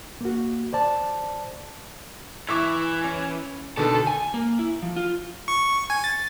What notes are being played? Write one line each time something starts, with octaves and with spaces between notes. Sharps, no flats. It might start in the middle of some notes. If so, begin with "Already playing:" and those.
A#3 F#4
C5 D5 A5
E3 E5 C#6 D6
C#4
B2 D3 D#3 A4
G#5
A#3
E4
F3
F4
C#6
G#5
A6